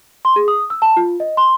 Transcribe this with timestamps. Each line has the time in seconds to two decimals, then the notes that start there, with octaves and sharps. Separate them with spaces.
0.25 C6
0.36 G#4
0.48 D#6
0.70 E6
0.82 A5
0.97 F4
1.20 D#5
1.37 C6